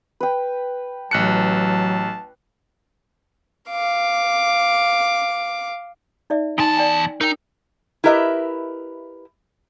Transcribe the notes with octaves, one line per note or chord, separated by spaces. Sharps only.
B4 G5
A1 F#3 A5 F#6 C#7
F5 D6
D#4 D5 E5
E2 D#4 G#5 A5 C6
D5 G5 G#5
D#4 A#4 G5
E4 G4 A#4 B4 D#5 E5